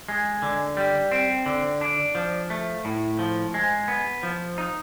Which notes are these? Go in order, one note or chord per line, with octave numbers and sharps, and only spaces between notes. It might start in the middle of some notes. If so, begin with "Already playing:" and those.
G#3
D3
G3
C4
D3
D4
F3
A3
A2
F3
G#3
B3
F3
D#4